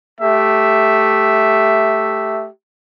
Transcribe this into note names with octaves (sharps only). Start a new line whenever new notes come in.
A3 G4 E5